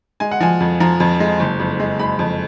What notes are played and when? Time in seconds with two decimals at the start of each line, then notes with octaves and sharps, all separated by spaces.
0.20 G#3 G#5
0.31 F#5
0.40 F3 G#5
0.60 F2
0.80 F3 A#5
1.00 F2
1.20 G#3
1.40 F#1
1.60 F2
1.80 G#3
1.99 G#3 B5
2.19 F2